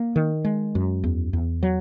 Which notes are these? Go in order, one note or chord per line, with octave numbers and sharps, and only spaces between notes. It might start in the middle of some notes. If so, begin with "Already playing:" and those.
Already playing: A#3
D#3
G#3
F#2
E2
E2
F#3